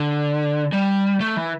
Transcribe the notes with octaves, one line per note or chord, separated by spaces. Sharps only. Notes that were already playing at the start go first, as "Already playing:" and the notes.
Already playing: D3
G3
A3
E3